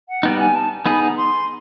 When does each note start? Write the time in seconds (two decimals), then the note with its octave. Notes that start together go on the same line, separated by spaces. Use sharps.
0.08 F#5
0.23 G3 B3 D#4 G5
0.39 G#5
0.55 A5
0.85 B3 D#4 G#4 B5
1.01 A#5
1.16 C6